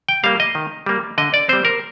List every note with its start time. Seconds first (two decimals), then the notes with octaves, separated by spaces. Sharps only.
0.09 G5
0.24 G3 A#3 F5
0.40 D#5
0.55 D#3
0.86 G3 A#3
1.18 D3 D#5
1.34 D5
1.49 G3 C4 C5
1.65 A#4